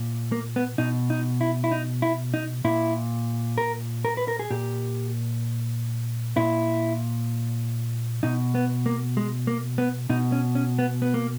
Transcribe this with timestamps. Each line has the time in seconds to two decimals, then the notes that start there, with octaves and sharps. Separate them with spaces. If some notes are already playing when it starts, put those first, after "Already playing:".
Already playing: A#2
0.32 A#3
0.56 B3
0.78 B2 D#4
1.10 D#4
1.41 E4
1.64 E4
1.71 D#4
2.02 E4
2.34 D#4
2.65 A#2 E4
3.58 A#4
4.05 A#4
4.17 B4
4.28 A#4
4.39 G#4
4.51 A#2 G4
6.37 A#2 E4
8.23 B2 D#4
8.55 B3
8.86 A#3
9.17 G#3
9.47 A#3
9.78 B3
10.10 B2 D#4
10.32 C#4
10.55 C#4
10.79 B3
11.02 B3
11.14 A#3